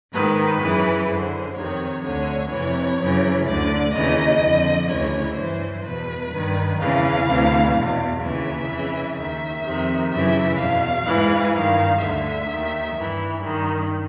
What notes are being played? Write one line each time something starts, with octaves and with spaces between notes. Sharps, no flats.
G#2 D#3 B4
F#2 C#3 E3
F#2 D3 C5
F2 C3 D#3 C#5
D2 D3 C#5
F2 C3 E3 C#5
F#2 C#3 E3
D2 D3 D5
D#2 C#3 E3 D#5
F2 D3
D2 C#3 E3 C#5
G2 E3 C5
E2 B2 B4
G2 D#3
E2 C#3 E3 F5
D2 C3 E3
E2 B2
D#2 C#3 E3 E5
F2 C#3 E3
D#2 D#3 E5
F2 C3 D#3
F#2 C#3 E3 E5
E2 B2 F5
G#2 E3
G2 D#3 F5
D2 D3 E5
D#2 D#3
G2 E3
G2 D#3